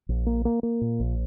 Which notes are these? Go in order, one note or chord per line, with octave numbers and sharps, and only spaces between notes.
A#1
A#3
A#3
A#3
A#2
A#1